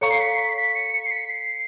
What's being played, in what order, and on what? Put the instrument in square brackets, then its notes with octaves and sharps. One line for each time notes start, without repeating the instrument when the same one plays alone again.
[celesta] A4 C#5 F5 A#5 C#6 [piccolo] C#7
[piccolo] C7
B6
C7
B6
B6
C#7
C#7
C7
B6
C7